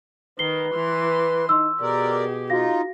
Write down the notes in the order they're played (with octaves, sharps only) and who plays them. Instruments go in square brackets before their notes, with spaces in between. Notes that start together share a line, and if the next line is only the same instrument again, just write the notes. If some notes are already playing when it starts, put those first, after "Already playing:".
[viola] D#3 [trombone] B4 [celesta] C7 G7
[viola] E3 C6
[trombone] D#4 [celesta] C6 E6
[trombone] B2 [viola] G4 G#4 [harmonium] A#4 D5
[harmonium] D#4 F4 [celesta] F#4 F5 A#6